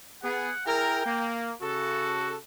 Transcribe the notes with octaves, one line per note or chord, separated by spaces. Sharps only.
B3 G#4 F#5
E4 G#4 A#4 G5
A#3
C#3 F#4 A4